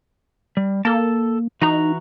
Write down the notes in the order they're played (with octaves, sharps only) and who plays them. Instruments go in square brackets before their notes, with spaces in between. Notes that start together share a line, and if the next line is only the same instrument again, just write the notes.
[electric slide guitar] G3
[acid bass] A#3 [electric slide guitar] A4 A5
[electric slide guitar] E3 F#4 A#5 [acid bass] D#4